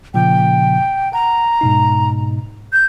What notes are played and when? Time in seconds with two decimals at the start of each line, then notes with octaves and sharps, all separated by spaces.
0.14 A#2 C#3 F3 G5
1.13 F#5 A#5
1.61 G#2 B2 D#4
2.73 G6